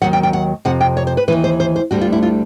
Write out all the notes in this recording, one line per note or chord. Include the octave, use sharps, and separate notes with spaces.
D#2 D#3 F#3 F#5
G5
G5
F#5
F2 C3 F#5
G5
C#5
C5
B4
D#2 C#3 E3 B4
C5
C5
C5
D2 D3 G3 F#4
F4
E4
F4